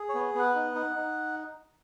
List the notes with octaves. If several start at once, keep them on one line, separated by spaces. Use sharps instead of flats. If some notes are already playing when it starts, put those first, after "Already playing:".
Already playing: G#4
C#5
B3
B3 F#5
D#4
D#4
D#4